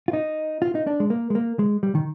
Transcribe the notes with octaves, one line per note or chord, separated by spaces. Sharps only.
F4
D#4
F4
D#4
D4
G#3
A#3
G#3
A#3
G#3
G3
D#3